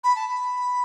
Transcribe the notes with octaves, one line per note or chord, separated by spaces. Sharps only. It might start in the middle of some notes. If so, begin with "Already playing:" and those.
B5
A5
B5